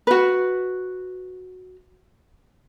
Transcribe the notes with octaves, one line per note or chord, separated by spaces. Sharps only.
F#4 B4